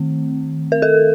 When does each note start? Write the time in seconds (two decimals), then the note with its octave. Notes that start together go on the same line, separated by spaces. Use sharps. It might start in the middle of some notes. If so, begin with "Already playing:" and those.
Already playing: D#3 A3 C4
0.72 A#4
0.82 A4